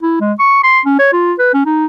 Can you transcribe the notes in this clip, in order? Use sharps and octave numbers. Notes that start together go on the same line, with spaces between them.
E4
G#3
C#6
C6
C#4
C#5
F4
B4
C#4
D#4